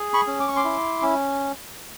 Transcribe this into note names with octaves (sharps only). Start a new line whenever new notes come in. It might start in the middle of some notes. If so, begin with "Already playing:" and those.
Already playing: G#4
B5 C#6
C#4
D6
C#6
C6 D6
E4
C#4